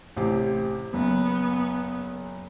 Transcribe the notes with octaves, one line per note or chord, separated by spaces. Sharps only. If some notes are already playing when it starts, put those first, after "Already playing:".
A1 C3 G4
F#1 B3